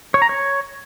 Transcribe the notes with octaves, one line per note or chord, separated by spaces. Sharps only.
C#5
A#5
C#5